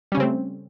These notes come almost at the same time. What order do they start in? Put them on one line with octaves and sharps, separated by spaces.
G3 C#4 C#3 C4 A3